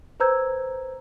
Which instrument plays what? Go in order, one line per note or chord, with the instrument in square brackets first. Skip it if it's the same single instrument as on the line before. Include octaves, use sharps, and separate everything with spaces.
[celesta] B4 C5 A#5 E6 G6 G#6